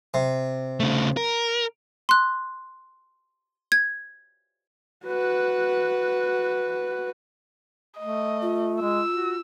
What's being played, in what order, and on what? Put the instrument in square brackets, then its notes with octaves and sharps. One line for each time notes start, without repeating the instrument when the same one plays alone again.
[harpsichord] C3
[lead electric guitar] C#3 A3
A#4
[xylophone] C6 F#6
G#6
[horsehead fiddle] F#4 B4
[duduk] A3 [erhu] D#5
[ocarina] F4
[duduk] G#3 [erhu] E6
[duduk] F#4